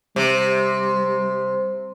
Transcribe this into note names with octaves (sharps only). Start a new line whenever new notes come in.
C3 G3